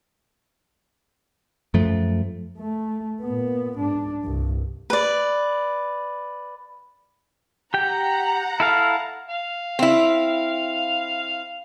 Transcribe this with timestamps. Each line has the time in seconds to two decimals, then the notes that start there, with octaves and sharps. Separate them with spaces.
1.74 F#2 F3 A3
2.58 A3
3.21 A#2 B3
3.78 G#2 D4
4.22 C2 G2
4.90 B4 D5
7.74 G4 F#5 G5 A#5
8.60 E4 A4 F5
9.29 F5
9.79 C4 E4